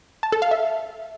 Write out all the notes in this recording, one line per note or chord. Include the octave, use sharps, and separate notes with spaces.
A5
A4
F5
E5